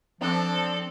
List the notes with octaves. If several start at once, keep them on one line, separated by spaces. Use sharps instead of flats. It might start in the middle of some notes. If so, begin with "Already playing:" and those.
F3 C4 D4 A4